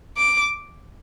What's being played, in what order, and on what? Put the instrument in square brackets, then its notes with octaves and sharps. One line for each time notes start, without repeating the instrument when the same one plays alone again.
[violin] D6